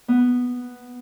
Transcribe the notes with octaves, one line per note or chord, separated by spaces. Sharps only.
B3